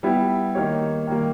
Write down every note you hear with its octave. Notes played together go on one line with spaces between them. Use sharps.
G3 B3 E4 G4
D#3 A#3 D#4 G4 C#5
D#3 G3 A#3